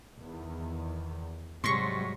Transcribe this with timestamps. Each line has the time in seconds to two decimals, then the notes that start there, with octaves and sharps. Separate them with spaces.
0.18 E2 D#3
1.64 G#2 C3 F#3 G3 C6 C#6